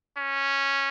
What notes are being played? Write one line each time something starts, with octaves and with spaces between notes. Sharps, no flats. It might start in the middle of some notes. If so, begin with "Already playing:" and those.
C#4